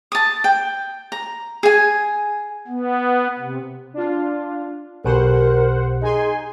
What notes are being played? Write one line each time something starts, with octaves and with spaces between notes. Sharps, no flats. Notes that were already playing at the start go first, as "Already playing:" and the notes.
A5 D#6
G5
A#5
G#4 G#5
B3
C3
D4 F4
B1 B2 G4 A#4 C5 F#5
D#4 G#4 G#5 C6